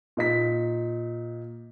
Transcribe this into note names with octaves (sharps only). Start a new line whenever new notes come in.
A#2 D#4 B6